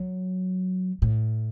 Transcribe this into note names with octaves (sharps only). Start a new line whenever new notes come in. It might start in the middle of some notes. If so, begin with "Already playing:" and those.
Already playing: F#3
A2